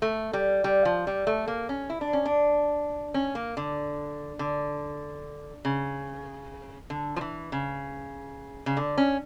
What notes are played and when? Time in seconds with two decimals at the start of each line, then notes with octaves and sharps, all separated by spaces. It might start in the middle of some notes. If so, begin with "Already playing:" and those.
0.02 A3
0.33 G3
0.64 G3
0.85 F3
1.07 G3
1.27 A3
1.48 A#3
1.69 C#4
1.90 E4
2.01 D4
2.13 C#4
2.26 D4
3.14 C#4
3.35 A#3
3.57 D3
4.39 D3
5.65 C#3
6.90 D3
7.16 F3
7.21 E3
7.52 C#3
8.66 C#3
8.77 D3
8.98 C#4